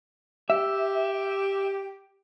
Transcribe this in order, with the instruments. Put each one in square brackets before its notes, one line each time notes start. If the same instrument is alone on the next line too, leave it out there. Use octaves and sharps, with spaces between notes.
[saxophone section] G4 [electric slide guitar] E5